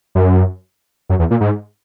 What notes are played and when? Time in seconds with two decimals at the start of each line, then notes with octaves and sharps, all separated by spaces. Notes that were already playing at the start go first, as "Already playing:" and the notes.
0.15 F#2
1.09 F#2
1.19 E2
1.31 A#2
1.41 G#2